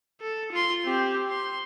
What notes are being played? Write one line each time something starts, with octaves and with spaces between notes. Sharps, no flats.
A4
F4 C6
C4 G4
C6